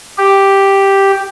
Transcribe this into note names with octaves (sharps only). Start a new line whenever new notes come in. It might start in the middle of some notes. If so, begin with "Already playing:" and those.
G4